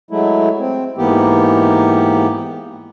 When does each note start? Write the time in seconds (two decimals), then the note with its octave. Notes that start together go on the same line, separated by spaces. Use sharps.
0.11 F#3 G#3 A3 E4
0.59 C4
0.98 G#2 E3 A#3 B3 G4